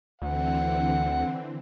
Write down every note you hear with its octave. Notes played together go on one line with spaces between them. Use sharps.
D2 D3 E3 C4 F#5